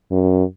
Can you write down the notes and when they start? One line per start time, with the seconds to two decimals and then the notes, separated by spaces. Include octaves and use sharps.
0.11 F#2